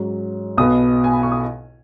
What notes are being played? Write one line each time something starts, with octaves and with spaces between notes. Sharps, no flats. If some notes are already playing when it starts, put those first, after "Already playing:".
Already playing: G#2 F#3 C#4
B1 B2 B3 D#6
G#5
B5
C#6
D#6